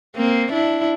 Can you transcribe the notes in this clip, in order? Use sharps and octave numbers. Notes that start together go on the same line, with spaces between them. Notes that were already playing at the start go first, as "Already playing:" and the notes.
A#3 C4
D4 E4